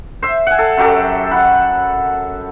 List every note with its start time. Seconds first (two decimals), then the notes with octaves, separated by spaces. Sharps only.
0.22 C5 E5
0.47 F#5 G#5
0.58 A4
0.77 F#2 F#3 G4 A4
1.31 F#5 B5